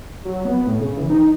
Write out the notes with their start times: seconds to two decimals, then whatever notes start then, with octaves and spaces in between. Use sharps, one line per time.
0.25 F#3
0.45 B3
0.66 A2
0.80 C#3
0.97 E3
1.10 D#4